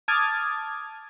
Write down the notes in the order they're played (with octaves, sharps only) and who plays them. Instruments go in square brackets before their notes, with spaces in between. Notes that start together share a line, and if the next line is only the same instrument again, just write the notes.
[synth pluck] A5 D6 D#6 F6 G#6 A6